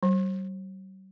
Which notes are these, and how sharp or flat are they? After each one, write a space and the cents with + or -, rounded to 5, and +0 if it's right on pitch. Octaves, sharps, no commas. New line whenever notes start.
G3 -45